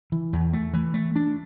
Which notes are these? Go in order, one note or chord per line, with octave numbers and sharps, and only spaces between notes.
E3
E2
A3
E3
A3
D4